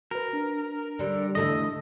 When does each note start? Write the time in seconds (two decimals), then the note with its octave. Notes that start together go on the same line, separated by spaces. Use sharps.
0.11 F#4 A#4 B4
0.33 D4
0.99 D3 G3
1.35 E2 D3 A3 D4 E4 D#5